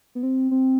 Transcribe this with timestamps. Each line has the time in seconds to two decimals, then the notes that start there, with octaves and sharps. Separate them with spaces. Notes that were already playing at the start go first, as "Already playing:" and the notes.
0.15 B3
0.23 C4
0.51 C4